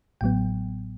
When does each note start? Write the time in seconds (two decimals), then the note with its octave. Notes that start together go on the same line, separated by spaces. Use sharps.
0.21 A1 A2 F#3 B3 G5